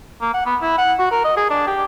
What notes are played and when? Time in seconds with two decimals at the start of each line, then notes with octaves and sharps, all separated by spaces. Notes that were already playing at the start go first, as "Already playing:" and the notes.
0.22 A#3
0.34 F#5
0.46 B3
0.61 E4
0.78 F#5
0.99 F#4
1.11 A#4
1.24 D#5
1.37 G#4
1.50 D4
1.67 G4